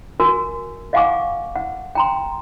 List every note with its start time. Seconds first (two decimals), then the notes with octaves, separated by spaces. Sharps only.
0.20 F#4 A#4 G#5
0.93 D#5 F5 F#5 G#5 C#6 D6
1.56 F#5
1.95 G5 A#5 C6